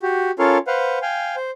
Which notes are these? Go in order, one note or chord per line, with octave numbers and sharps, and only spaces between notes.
F#4 G4
C#4 F4 A4 A#4 C#5 F5
B4 C5 F5 F#5
F5 G5 G#5
C5